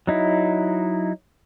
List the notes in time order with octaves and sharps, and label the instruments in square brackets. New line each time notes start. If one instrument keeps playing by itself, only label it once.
[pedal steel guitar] F#3 D#4 E4